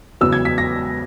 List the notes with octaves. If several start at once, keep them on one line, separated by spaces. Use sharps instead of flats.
E2 C#3 F#3 B3 E6
G#6
B6
A#6